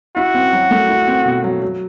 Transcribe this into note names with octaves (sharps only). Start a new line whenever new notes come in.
E4 F#4
C4
F#3
A3
E4
C4
B2
F#3
F#3